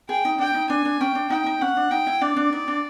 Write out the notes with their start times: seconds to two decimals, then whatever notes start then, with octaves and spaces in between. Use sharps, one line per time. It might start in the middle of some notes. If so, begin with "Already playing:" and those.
0.09 G#4 G5
0.25 D#4
0.39 D4 G5
0.54 D#4
0.70 D4 G#5
0.85 D4
1.00 C#4 G5
1.15 D4
1.30 D#4 G5
1.46 D#4
1.61 C#4 F#5
1.77 D4
1.91 D#4 G5
2.07 E4
2.21 D4 D5
2.36 D4
2.53 D#4
2.68 D4